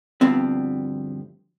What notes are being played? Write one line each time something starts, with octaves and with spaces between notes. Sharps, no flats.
D2 G2 F3 B3 C4